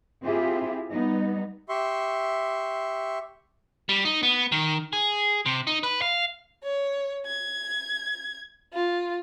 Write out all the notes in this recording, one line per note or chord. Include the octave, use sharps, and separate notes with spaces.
C4 E4 F4 G4 G#4 E5
G3 B3 D#4
G4 E5 C6 C#6
G3
D#4
B3
D#3
G#4
C3
D#4
B4
F5
C#5
G#6
F4